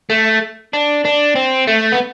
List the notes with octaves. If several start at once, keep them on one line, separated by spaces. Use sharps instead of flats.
A3
D4
D4
C4
A3
B3